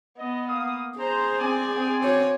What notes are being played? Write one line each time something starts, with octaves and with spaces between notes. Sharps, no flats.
B3 D#5
A#3 F5 D#6
G#4 C5 A#5
C4 C5 D5 G#5
C4
F#4 C#5